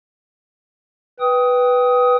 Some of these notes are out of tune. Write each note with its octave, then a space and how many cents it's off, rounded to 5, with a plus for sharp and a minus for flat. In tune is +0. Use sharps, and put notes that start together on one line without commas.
B4 +0 G5 +0 D#6 +15